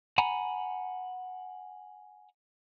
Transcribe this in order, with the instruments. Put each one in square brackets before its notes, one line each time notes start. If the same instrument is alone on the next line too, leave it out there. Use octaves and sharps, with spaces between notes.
[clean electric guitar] F#5 G#5 A#5 B5